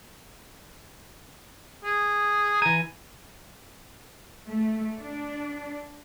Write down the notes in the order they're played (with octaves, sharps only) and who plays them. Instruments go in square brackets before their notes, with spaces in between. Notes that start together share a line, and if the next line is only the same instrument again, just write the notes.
[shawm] G#4
[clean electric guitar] E3 G#5 [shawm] A#5
[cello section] A3
D4